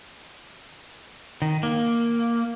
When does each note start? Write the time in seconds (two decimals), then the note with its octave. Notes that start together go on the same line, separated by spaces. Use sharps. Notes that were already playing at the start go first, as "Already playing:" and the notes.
1.42 D#3
1.63 A#3